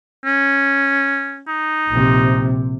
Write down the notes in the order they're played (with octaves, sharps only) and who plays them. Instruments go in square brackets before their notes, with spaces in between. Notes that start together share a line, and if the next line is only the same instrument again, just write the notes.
[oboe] C#4
D#4
[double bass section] A#1 C3